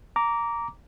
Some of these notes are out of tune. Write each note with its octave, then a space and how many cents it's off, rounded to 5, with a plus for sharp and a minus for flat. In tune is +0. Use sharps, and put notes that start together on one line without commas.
A#5 +0 D6 -15